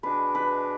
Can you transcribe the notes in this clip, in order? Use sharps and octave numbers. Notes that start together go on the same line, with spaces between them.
B2 G#3 D4 B4
B4